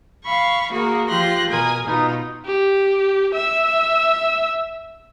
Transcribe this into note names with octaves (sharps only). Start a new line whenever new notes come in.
F5 B5 C#6
A#3 F#4 G#4 A#4
F3 F4 G4 C6 F#6 A#6
B2 A#4 G#5 D#6
B2 B3 D#4 F4
G4
E5 E6